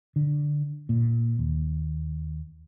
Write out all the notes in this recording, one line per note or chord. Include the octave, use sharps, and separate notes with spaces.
D3
A#2
D#2